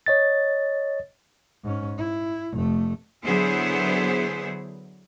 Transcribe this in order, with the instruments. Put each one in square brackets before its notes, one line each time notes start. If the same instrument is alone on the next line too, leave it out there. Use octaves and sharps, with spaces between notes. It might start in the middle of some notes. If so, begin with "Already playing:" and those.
[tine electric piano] C#5 D#5 A6
[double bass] G#2 C#4
E4
F1 A3
[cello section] D3 F#3 B3 E4 G#4 C5